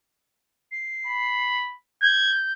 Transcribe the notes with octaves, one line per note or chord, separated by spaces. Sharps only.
C7
B5
G6 G#6